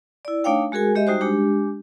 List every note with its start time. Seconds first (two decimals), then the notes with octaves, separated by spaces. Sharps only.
0.25 E4 D5
0.44 A3 D4 D#4 C#5 F5 G5
0.72 G#3 F#4 G#4 A#4 G#5
0.95 G#3 G4 D#5 E5
1.07 G3 D#4 F#4 C5
1.21 G#3 D4 G4